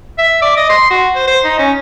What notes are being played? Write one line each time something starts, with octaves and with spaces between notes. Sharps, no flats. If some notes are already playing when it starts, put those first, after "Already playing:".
E5
D5
D#5
C6
F#4
C5
C5
D#4
C#4